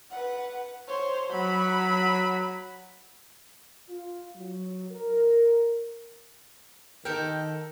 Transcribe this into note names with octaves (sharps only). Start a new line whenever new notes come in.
B4 F#5
C5 C#5
F#3 B5
F4
F#3
A#4
D#3 G4 A4 A#4 G5